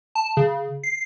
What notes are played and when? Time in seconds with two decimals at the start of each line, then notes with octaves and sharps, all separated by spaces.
0.15 A5
0.37 C#3
0.83 C7